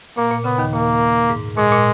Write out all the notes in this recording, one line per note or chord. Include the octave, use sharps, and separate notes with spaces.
A#2 A#3
A#2
C#3 B3
D#2 D#3
A#2 A#3
G#2
A#2 G#3
A#2